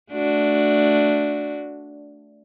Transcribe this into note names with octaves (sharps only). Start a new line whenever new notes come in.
A3 D4 F#4